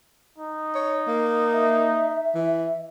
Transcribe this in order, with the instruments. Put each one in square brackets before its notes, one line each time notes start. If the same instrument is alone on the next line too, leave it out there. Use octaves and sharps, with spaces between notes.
[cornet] D#4
[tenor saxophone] C#5
A#3
[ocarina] E5
[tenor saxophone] E3